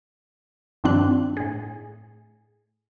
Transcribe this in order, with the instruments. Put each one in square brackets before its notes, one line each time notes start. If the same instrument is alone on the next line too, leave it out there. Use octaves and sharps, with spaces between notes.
[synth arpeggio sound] G2 D#3 F3 C4 D4 F#6
A2 G#4